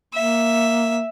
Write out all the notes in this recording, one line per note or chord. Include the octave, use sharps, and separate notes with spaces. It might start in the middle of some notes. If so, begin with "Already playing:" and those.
A#3 E5